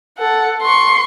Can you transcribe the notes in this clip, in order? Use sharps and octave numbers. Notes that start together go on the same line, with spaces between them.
A4 F#5
C6 C#6